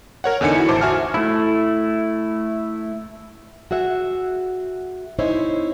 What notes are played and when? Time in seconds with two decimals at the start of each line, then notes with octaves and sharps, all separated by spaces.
0.24 A#4 C#5 F#5
0.41 E2 D3 D#4 G#5 C#7
0.55 E4 F#4
0.69 A1 C5 A5 D6
0.81 F#4 E5 G#5 A5 F6
1.14 A3 E4
3.71 F#4 G#4 E5 F#5
5.19 C4 D#4 E4 G#4 C5 C#5